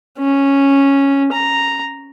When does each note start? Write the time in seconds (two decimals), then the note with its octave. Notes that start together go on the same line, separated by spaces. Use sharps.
0.19 C#4
1.32 A#5